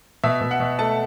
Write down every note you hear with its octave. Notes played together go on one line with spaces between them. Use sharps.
B2 E5
B2
F#5
B2
A3 A5